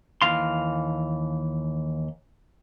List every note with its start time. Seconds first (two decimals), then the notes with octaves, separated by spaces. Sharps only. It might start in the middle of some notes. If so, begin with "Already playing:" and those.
0.22 D#2 E3 F5 C6